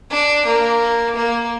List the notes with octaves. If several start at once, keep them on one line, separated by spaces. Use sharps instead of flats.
D4
A#3
A#3